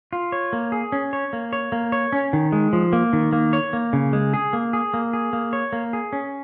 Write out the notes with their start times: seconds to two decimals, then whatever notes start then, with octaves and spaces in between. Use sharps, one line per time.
0.13 F4
0.32 C#5
0.53 A#3
0.72 G#4
0.92 C#4
1.13 C#5
1.33 A#3
1.53 C#5
1.72 A#3
1.92 C#5
2.12 C#4
2.33 D#3
2.52 G#3
2.73 F3
2.93 A#3
3.13 D#3
3.33 A#3
3.53 C#5
3.73 A#3
3.93 C#3
4.13 G#3
4.34 G#4
4.53 A#3
4.73 G#4
4.94 A#3
5.13 G#4
5.33 A#3
5.53 C#5
5.73 A#3
5.93 G#4
6.13 C#4